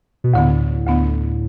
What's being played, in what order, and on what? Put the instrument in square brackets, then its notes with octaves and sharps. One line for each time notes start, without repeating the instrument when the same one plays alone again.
[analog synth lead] B2
[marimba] D2 D3 B3 [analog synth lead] A2
[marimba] D2 D3 B3